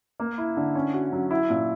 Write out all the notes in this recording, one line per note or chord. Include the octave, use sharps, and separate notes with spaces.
A#3
E4
D3
C#4
F#4
F#3
E4
A#2